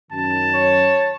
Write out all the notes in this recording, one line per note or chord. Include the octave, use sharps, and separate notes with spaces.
F#2 D#3 A5
C#5